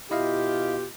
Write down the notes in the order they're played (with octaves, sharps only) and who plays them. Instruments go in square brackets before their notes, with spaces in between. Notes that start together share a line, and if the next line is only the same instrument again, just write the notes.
[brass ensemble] B2 F4 G4 [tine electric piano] E4 D#5 F5